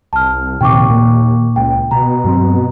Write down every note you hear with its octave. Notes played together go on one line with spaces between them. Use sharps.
C2 A5 F6
A#1 D#2 C3 G5 C#6 D6
A#2 A#3
C#2 G5
B2 A#5
G2 F#3 C4